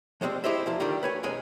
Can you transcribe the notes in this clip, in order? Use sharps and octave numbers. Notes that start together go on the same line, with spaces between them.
F3 G3 G#3 A#3 C4
E4 G4 G#4 C5 D#5 E5
E2 F3 E4
D3 D#3 G3 F4 G4
B4 C#5 G#5
B1 F2 G#3 C#4 G#5